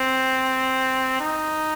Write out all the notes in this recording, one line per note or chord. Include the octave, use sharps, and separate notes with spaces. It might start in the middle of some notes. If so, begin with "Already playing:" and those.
Already playing: C4
D#4